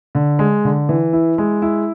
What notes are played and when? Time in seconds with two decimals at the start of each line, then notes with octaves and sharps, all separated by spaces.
0.15 D3
0.39 G#3
0.65 D3
0.89 E3
1.13 E4
1.38 G#3
1.62 E4